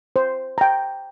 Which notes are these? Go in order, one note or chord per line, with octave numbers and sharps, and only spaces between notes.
C5
G5 A#5